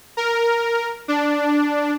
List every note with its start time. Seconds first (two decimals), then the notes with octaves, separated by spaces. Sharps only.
0.17 A#4
1.08 D4